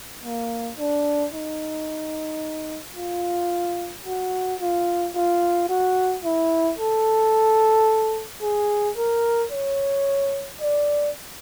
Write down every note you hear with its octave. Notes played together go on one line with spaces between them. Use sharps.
A#3
D4
D#4
F4
F#4
F4
F4
F#4
E4
A4
G#4
A#4
C#5
D5